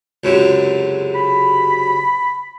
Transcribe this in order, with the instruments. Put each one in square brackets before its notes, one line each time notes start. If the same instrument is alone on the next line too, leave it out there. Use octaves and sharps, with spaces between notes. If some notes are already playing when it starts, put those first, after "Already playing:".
[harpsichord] C#2 F#2 C3
[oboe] B5